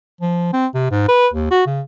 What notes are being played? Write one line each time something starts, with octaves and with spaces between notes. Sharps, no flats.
F3
C4
C3
G#2
B4
D#2
F#4
C#3